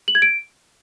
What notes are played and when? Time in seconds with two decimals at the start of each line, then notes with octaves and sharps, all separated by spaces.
0.08 F#7
0.15 G#6
0.22 D7